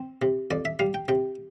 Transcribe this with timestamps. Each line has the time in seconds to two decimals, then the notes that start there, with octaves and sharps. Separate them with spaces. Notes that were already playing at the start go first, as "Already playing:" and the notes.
Already playing: C4
0.22 C3
0.51 F2 D5
0.65 E5
0.79 G3 F5
0.94 G5
1.08 C3 G5